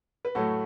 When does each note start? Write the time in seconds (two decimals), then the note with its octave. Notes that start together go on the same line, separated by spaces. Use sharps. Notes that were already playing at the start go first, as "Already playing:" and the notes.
0.25 B4
0.35 A2 F#3 A3 F#4 A4